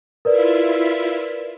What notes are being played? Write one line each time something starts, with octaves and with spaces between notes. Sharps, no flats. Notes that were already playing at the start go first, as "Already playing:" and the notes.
E4 F4 A#4 B4 D5 E5